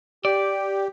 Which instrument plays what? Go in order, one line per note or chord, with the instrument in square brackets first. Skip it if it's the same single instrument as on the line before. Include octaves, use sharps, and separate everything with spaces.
[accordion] G4 [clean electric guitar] D5